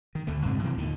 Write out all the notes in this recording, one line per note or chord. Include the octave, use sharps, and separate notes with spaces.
D#3
D2 D3 A3
D2 G2 C3 G#3
C3 E3 F3 C4
D#2 A#2 D3 D#3